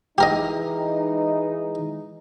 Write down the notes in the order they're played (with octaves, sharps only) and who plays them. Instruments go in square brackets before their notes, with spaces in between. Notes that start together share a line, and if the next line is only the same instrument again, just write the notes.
[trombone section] E3 G#3 D#4 [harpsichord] G4 A#4 D#5